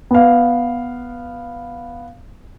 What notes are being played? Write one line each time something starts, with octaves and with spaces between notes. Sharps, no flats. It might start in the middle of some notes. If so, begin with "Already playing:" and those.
B3 F5